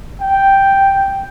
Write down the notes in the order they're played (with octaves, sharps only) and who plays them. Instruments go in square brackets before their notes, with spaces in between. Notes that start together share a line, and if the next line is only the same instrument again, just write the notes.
[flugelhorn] G5